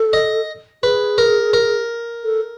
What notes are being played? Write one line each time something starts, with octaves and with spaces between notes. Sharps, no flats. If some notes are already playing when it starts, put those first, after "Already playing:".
Already playing: A4
D#5
G#4 B4
A#4
A#4
A4